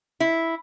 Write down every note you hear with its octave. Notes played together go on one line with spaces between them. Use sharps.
E4